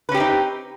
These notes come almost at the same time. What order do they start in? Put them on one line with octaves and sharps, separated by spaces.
B4 C#4 G4 C4 D#4